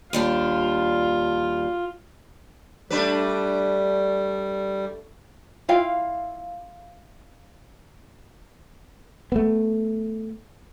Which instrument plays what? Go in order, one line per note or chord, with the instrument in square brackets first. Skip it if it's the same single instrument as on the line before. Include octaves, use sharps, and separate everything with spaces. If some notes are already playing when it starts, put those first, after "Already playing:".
[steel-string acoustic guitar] D#2 G3 D4 [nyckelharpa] F4
[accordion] G3 [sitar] A3 D4 B4
[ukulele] E4 F4 F5 G5
[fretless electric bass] A3 B3